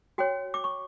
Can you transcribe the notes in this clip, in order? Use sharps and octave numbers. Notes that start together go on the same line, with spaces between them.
F#4 C#5 G5
D6
C#6